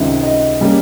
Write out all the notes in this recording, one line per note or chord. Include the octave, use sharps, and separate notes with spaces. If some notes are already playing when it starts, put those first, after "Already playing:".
Already playing: C#2 C3 D#3
D#5
C#3 G3 A#3